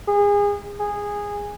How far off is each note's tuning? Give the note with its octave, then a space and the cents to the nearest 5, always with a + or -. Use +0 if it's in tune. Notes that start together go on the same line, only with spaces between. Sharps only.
G#4 -30
G#4 -15